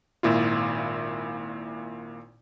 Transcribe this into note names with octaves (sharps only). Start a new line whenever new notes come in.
G#1 A#2 E4 F4